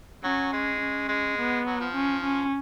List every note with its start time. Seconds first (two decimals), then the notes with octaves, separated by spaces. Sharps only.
0.24 F#3 C#4
0.53 G#3
0.80 C#4
1.09 G#3
1.38 B3
1.67 F#3
1.80 F3
1.95 C#4
2.24 C#4